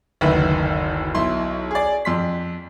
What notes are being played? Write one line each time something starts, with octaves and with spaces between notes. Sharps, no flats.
F#1 D2 D#3 B4 E5
B1 E4 C6
G#4 D5
F2 C6 B6